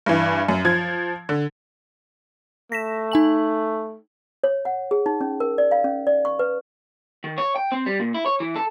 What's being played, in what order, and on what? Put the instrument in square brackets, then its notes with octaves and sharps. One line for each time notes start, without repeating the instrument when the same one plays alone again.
[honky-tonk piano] G2 E3
F#2
F3 G#6
D3
[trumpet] A3 [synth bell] A#6 B6 E7
[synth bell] D#4 G#5 F#7
[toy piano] C#5
F#5
G#4
D#4
C#4
A#4
D5
F5
C#4
D5
C#6
B4
[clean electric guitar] D#3
C#5
G5
C4
G3
A#2
E4
C#5
E3
A4